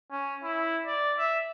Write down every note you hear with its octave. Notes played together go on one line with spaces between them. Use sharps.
C#4
E4
D5
E5